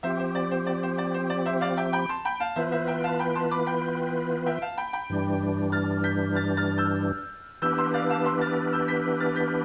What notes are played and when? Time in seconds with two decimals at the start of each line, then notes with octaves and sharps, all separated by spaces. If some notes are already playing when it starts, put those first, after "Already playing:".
0.03 F3 C4 G4 C5 E5
0.19 C5
0.35 D5
0.51 C5
0.66 D5
0.83 C5
0.98 D5
1.14 C5
1.30 D5
1.46 C5 E5
1.61 D5 F5
1.77 E5 G5
1.93 G5 B5
2.09 A5 C6
2.25 G5 B5
2.40 F5 A5
2.56 E3 B3 F4 B4 C5 E5
2.72 C5 E5
2.88 E5 G5
3.04 F5 A5
3.19 G5 B5
3.35 A5 C6
3.51 B5 D6
3.66 G5 B5
4.46 E5 G5
4.62 F5 A5
4.77 G5 B5
4.93 G5 B5
5.10 G2 E3 G3 D4
5.72 F6 A6
6.04 G6 B6
6.35 F6 A6
6.57 F6 A6
6.78 E6 G6
7.62 E3 B3 D4 G4 B4 E6 G6
7.78 C6 E6
7.94 D5 F5
8.09 F5 A5
8.26 C6 E6
8.41 F6 A6
8.73 E6 G6
8.88 G6 B6
9.20 F6 A6
9.36 G6 B6